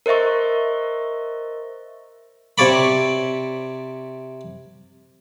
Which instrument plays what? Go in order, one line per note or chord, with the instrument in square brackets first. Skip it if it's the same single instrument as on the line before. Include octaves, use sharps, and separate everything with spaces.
[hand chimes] A#4 C5 D#5 E5 C#6
[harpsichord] C3 C#5 D5 B5